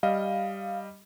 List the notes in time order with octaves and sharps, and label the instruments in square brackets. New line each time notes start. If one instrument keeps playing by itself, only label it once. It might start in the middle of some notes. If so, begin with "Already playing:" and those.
[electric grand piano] G3 D#5 [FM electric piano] F5